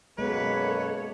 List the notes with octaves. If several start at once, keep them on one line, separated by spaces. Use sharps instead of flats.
F#2 B2 G#3 A#3 B3 A4 B4 C#5